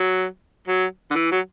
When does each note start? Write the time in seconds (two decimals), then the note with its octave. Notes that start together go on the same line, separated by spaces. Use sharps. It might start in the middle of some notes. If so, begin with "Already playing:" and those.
Already playing: F#3
0.67 F#3
1.11 D3
1.15 E3
1.32 F#3